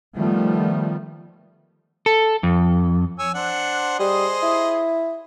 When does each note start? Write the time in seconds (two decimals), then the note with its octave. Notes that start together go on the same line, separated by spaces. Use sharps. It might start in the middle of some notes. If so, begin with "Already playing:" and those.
0.15 D#3 F3 G3 A3 B3
2.06 A4
2.43 F2
3.19 C#5 G#5 E6
3.34 D4 C5 F#5
3.99 G3 G#4 C5 D#5
4.42 E4